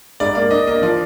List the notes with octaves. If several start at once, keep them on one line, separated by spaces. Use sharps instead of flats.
G#2 D5
A#3 D5
D4 D#5
A#3 D#5
F3 D5